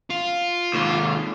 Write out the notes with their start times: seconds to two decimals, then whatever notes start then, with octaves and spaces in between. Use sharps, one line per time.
0.10 F4
0.74 D#2 G#2